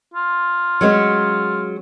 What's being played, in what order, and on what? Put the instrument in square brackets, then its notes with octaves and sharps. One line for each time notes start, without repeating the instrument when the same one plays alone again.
[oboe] F4
[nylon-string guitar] F#3 G#3 C#4